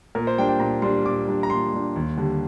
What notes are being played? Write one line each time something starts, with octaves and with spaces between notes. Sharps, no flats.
A#2 A#4
C5
G3 D4 G5
G5
A#2 A#5
G3 D4 C6
A#2 D6
G3 D4
A#5
A#2 C6
G3 D4
D#2
D3 G3